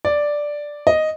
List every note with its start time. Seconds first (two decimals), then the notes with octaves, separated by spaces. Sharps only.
0.05 D5
0.87 D#5